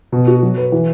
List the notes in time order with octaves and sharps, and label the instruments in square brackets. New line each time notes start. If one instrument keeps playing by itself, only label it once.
[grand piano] B2
F#4
F#3
B4
E3